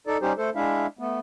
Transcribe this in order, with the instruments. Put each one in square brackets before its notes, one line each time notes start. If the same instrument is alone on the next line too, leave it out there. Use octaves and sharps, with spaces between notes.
[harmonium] D#4 A4 D5
G3 C#4 D#4 G4 C5
A3 A4 C5
G#3 D4 E4 E5 F5
A3 B3